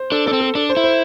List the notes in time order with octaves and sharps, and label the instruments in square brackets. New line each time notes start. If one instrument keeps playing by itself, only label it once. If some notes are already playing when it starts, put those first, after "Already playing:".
Already playing: [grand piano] C5
[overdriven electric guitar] D4 [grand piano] A4
[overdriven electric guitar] D4 [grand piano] A4
[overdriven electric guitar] C4
[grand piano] A4
[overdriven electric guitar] D4 [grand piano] A4
[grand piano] C5
[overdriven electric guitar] E4
[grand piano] C5